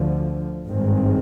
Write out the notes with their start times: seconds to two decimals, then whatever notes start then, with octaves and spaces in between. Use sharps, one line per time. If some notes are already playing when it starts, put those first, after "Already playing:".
Already playing: D2 D3 F3
0.66 G#1 G2 D#3 G#3 C4